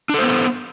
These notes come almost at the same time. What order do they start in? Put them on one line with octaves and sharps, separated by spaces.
D4 A4 C5 B3